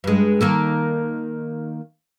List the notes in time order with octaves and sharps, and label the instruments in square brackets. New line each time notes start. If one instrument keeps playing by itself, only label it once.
[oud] G2 G#3
D#3 A#3 A4